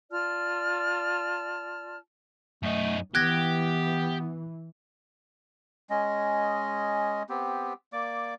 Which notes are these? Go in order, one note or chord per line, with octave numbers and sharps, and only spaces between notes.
F4 D5 A5 F6
F#2 A3 D#4
E3 B3 G4 F#6 G#6 A#6
G#3 C#4 D#5
B3 C4 G4
A#3 D5 D6